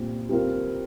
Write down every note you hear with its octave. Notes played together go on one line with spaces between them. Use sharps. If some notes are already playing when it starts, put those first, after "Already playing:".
Already playing: A#2 G3 C4
G3 C4 F4 A#4